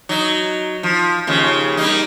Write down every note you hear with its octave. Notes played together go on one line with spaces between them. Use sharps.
F#3 D#4
F3
D#2 C#3 F3
G3 A#3 D#4